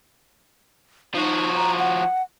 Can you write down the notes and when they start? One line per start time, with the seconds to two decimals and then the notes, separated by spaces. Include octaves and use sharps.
1.15 F3 D#4 F#4
1.56 A#5
1.79 F#5